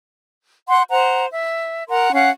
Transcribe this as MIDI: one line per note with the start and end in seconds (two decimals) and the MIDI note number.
0.68 0.82 78
0.68 0.82 84
0.90 1.25 72
0.90 1.25 78
0.90 1.25 82
1.32 1.83 76
1.88 2.11 70
1.88 2.11 78
1.88 2.11 82
1.88 2.11 84
2.14 2.29 61
2.14 2.29 77
2.14 2.29 78